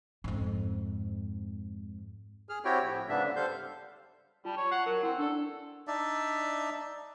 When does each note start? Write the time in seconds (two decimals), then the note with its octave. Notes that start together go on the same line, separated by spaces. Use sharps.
0.24 F2 G#2
2.49 G#4 F6
2.65 C4 E4 F#4 G4 C#5 G5
2.84 A2 F3
3.09 G#2 C#3 B3 D4 E5
3.24 D3
3.36 G3 A4 C5 F5 G6
4.45 G3 F4 A5
4.57 C#5
4.71 F#5 C7
4.86 F#3 A#4
5.03 C4 E4 F#5
5.18 D4 A4 D5
5.87 D4 D#4 D5 E5